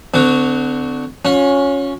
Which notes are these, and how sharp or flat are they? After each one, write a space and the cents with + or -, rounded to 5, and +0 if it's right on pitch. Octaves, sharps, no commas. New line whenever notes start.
D3 +0 C4 -45 F#4 +0
C#4 +0 F4 +45